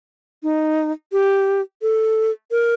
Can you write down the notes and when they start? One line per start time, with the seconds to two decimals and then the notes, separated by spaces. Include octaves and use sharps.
0.43 D#4
1.12 G4
1.82 A4
2.51 A#4